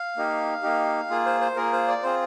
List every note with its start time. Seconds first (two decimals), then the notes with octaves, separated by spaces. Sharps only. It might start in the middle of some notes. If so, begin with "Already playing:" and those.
Already playing: F5
0.17 A#3 D#4 G4
0.63 A#3 D#4 G4
1.10 A#3 F4 G#4
1.26 C5
1.41 C5
1.56 A#3 F4 G#4 A#4
1.73 C5
1.88 D5
2.03 C4 F4 G#4 C5